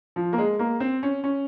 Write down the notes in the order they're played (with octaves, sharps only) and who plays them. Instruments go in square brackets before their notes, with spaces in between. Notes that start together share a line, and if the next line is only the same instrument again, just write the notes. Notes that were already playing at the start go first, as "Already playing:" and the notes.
[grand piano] F3
A#3
G#3
A#3
C4
C#4
C#4